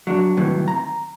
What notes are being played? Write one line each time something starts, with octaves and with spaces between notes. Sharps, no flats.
F#3 D4
A2 C3 D#3 E3 F#3 G3
A#5